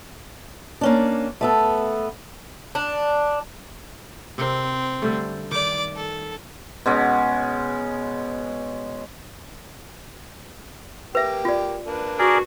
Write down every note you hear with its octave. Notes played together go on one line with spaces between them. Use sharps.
A#3 C#4 D4
A3 B3 A4
D4
C3 C4 A#4
D3 G3 A3
D#3 D5 D6
A4
B2 G#3 C#4
A#3 G4 B4 E5
F4 D5
A#3 D4 B4
F#4 G#4 A#4 D5